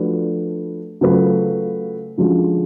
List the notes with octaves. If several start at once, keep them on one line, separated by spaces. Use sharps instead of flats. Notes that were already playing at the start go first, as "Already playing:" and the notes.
Already playing: F3 A3 D4 F#4 B4
C#3 F#3 A3 F4 B4
D3 F3 G#3 C#4 F#4